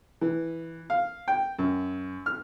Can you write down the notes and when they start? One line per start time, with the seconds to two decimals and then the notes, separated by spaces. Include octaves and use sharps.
0.21 E3
0.90 F5
1.28 G5
1.59 F#2
2.26 F6